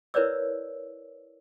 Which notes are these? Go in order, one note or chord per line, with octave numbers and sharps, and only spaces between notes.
E4 A#4 B4 C#5 D5 E6